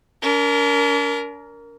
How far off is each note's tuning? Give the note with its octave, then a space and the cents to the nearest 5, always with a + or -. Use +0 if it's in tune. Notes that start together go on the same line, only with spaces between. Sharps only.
D4 -45 A#4 +0